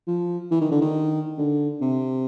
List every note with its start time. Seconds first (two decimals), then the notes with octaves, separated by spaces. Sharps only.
0.08 F3
0.51 E3
0.61 D#3
0.71 D3
0.81 D#3
1.38 D3
1.81 C3